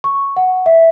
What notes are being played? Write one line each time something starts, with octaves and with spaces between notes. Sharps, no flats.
C#6
F#5
E5